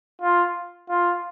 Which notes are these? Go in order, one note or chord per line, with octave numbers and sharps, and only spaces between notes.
F4
F4